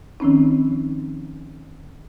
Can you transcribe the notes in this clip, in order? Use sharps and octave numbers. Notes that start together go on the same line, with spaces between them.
D#3 F3 C4 C#4 D#4